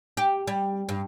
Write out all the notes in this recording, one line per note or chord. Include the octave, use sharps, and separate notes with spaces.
G4
G3
G2